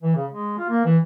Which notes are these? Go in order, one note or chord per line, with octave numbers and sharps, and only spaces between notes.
E3
C#3
G#3
F4
A#3
E3